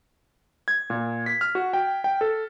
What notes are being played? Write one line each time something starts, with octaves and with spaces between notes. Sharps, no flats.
G#6
A#2
B6
F6
F#4
G5
G5
A4